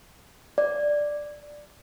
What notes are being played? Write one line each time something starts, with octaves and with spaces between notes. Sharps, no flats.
D5